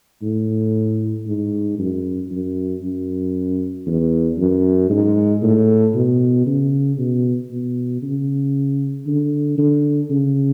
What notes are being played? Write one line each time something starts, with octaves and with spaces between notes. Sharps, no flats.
A2
G#2
F#2
F#2
F#2
E2
F#2
G#2
A2
B2
C#3
B2
B2
C#3
D3
D3
C#3